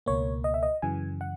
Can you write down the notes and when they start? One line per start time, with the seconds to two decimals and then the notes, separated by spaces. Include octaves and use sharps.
0.06 C#2 B2 A#3 C#5
0.44 D#5
0.54 E5
0.63 D#5
0.82 F#2 C#3 E3 G#5
1.21 F#5